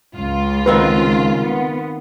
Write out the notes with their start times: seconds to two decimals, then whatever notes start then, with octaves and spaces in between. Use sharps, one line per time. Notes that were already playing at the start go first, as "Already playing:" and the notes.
0.15 C#2 F4
0.66 D#3 C4 F#4 B4
1.45 B3